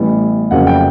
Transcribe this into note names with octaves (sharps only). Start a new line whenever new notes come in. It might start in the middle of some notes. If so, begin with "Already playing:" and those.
Already playing: A1 A2 E3 G3 B3
F1 F2 C#3 F#3 A#3 F#5
G5